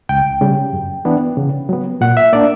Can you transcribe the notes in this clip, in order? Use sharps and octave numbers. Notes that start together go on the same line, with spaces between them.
C#2 G5
C#3 G3
F#2
E3 B3 D4
C#3
F#3 B3
A#2 F#5
E5
A#3 D4 D5